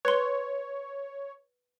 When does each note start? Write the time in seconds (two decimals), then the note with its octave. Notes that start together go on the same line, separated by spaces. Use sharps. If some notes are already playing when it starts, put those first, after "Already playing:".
0.05 B4 C#5 C6